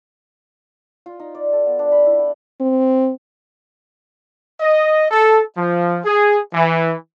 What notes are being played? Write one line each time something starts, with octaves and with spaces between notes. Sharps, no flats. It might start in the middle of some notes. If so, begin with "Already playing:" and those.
F4
D#4
D5
A4
B3
D4
B5
E4
G5
C4
D#5
A4
F3
G#4
E3